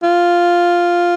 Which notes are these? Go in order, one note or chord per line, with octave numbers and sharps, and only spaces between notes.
F4